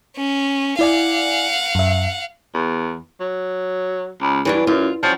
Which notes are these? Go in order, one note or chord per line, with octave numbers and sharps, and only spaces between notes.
C#4
E4 D5 F5 F#5 G#5
F#2 E5
E2
F#3
C#2
G2 E3 F#3 D4
F#2 F4
F3 G3 C#4 F#4